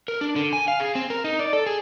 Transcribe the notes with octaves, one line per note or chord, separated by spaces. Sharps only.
A#4
D4
D3
G#5
F5
G#4
C4
A#4
D#4
D5
A4
G#4